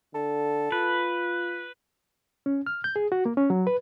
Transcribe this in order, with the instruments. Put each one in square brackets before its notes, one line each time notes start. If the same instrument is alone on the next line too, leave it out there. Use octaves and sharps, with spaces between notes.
[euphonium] D3 [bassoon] A4
[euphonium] F4 [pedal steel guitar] B4
[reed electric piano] C#4
F6
G6
G#4
F#4
A#3
C#4
F#3
B4